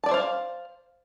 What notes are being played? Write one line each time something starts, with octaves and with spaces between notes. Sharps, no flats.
C5 D5 E5 F5 A5